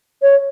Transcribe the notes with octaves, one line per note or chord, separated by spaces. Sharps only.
C#5